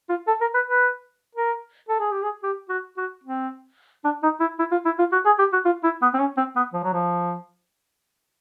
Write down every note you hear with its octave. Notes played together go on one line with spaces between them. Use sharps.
F4
A4
A#4
B4
B4
A#4
A4
G#4
G4
G#4
G4
F#4
F#4
C4
D4
D#4
E4
E4
F4
E4
F4
F#4
G#4
G4
F#4
F4
E4
B3
C4
C#4
C4
B3
F3
F#3
F3